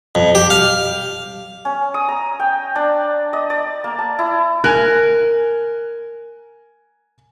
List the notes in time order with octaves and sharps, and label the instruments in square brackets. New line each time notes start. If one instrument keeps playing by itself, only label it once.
[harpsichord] F2
G4
F5
[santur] C#4
D#6
A#5
G5
D4
D#5
D5
A#3
A5
E4
[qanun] A#4 [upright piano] G#5 F#6